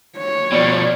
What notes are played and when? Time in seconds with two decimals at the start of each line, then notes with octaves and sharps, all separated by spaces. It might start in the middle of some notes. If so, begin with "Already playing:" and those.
0.18 C#5
0.52 B2 F3 D5